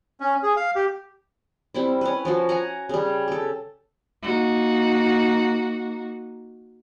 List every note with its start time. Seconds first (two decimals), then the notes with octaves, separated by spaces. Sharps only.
0.20 C#4
0.43 G#4
0.57 F5
0.75 G4
1.74 G3 C4 E4
2.01 C#4 B4
2.25 F3 F4 F#4
2.49 F#5 G#5 A#5
2.89 C#3 G3
3.28 G4 A4
4.22 A#3 D#4 F#4